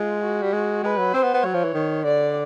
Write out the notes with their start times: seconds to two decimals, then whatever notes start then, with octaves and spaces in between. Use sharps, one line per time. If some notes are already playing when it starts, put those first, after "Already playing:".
Already playing: G#3 F4
0.23 F#4
0.42 G3
0.53 G#3
0.84 G#3 B4
0.98 F#3
1.14 C4 C5
1.23 B3
1.34 B3
1.44 F#3 C#5
1.54 F3
1.64 E3
1.74 D#3
2.04 D3 D5